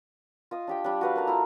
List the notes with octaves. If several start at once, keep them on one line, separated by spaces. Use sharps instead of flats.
F4 D#5 D#6
D4 G4 G5
G3 D4
F#4 B4 F5
A#3 D#4 A4 A#5
E4 F4